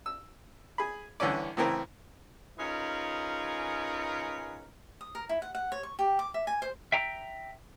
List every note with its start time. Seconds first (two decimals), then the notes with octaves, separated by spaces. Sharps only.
0.06 E6
0.78 G#4 B5
1.20 C2 D3 E3 C#4 D5
1.57 A2 C#3 E3 C4 A#4
2.58 C#4 D#4 F4 G#4 A#4 B4
5.01 D#6
5.15 A#4
5.29 E4
5.42 F#5
5.55 F#5
5.72 C#5
5.83 C#6
5.99 G4
6.19 D6
6.34 E5
6.47 G#5
6.62 C5
6.92 E5 G5 A#5